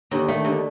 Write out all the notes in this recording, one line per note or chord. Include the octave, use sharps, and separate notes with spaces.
D#2 D3
D#3 A3
D#2 D3